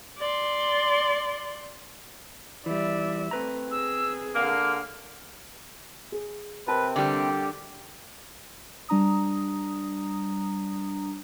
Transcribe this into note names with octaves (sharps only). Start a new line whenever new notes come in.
D5 C6
E3 G3 D5 E5
A3 C4 B4 A#5
G#4 E6
D3 A#3 F6
G#4
C3 C4 A#4 B4 A5
D3 G3 G4
G3 D4 A#5 D#6